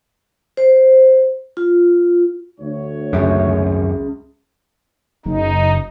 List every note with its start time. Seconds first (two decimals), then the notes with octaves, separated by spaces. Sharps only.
0.57 C5
1.57 F4
2.60 D2 C#5
3.13 G#1 C#2 F#2 E5
5.26 F#1 D#4